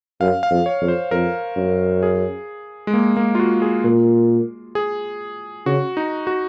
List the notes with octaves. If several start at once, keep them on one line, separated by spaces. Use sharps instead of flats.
F#2 F5
F5
F2
C#5
F2
C5
F2 A#4
F#2
G#4
G#3
A#3
A#3
F4
F#4
G#4
A#2
G#4
C#3 F#4
D#4
F#4